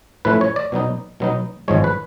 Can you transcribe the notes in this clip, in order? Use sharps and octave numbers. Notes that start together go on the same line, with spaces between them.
A2 F3 A3 C#4 E4 B4
C#5
D5
B2 F#3 B3 D#4
B2 F#3 B3 D#4
G#1 G#2 F3 G#3 C#5
B4